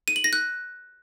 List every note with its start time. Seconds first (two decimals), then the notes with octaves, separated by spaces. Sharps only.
0.08 D#7
0.16 F#7
0.24 A#6
0.33 F#6